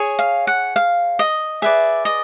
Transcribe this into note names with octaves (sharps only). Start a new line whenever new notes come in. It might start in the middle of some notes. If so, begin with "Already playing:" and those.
Already playing: G#4 C#5
F5
F#5
F5
D#5
G#4 B4 D5 E5
D#5